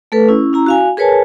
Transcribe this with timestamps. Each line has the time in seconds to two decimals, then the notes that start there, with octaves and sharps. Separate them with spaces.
0.12 A3 A4 B4
0.28 C#4 E4
0.53 C#4 E4 A#5
0.66 F#4 F5 G#5
0.97 G#4 A#4 B4 C#5 G#5 A5